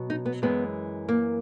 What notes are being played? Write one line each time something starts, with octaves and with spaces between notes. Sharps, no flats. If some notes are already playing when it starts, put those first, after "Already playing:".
Already playing: B2 F#3
D#4
B3
F#2 E3 G#3 B3
A#3